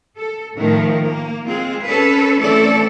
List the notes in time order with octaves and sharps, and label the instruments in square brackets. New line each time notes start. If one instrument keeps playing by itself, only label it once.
[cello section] A4
A2 D#3 F3 A3 A#4
A#3
G#3 C4 F4 G#4
C#4 A4 B4
E3 A3 C4 C#4 A4 D5